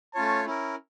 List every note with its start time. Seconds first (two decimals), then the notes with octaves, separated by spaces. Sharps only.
0.15 A3 C#4 F4 C#5 A5
0.45 C#4 E4 A#4